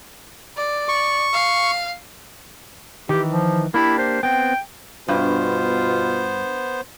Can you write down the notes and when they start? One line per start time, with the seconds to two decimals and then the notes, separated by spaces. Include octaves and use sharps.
0.57 D5
0.89 C#6
1.33 F5
3.09 D#3 E3 G4
3.29 F3
3.74 A#3 D4 E4 G4
3.98 C5
4.23 B3 C4 G5
5.08 G2 B2 B3 F4 C5